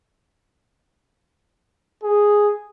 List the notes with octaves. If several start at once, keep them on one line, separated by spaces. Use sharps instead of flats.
G#4